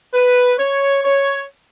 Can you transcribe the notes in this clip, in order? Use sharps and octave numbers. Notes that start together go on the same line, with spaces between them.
B4
C#5
C#5